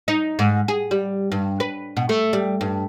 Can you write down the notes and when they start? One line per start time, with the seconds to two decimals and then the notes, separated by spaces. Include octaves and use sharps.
0.08 D#4
0.39 G#2
0.68 G#4
0.91 G3
1.32 G2
1.60 B4
1.97 B2
2.09 A3
2.33 G3
2.61 G2